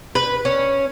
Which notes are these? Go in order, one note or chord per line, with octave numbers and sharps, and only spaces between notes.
B4
C#4